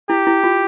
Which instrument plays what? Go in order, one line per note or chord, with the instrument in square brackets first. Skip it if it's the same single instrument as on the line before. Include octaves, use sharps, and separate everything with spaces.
[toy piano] E4 [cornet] G4
[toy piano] E4
F4